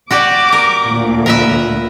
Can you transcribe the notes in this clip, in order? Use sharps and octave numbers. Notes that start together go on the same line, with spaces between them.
F#4 G4 D5 D6
A#4
D2 A#2
A#4 B4 E5